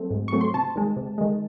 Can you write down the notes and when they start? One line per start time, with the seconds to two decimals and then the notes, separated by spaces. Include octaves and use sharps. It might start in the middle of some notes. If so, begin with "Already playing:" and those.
Already playing: F#3 A3 C4
0.11 G#2
0.28 F#3 A3 C4 C#6
0.41 C6
0.54 C3 A5
0.75 D#3 G#3
0.97 C3
1.18 D#3 G#3